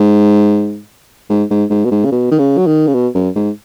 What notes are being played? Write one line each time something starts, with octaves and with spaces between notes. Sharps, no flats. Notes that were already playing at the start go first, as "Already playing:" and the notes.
Already playing: G#2
G#2
G#2
G#2
B2
G#2
C#3
B2
D#3
C#3
F#3
D#3
C#3
B2
F#2
G#2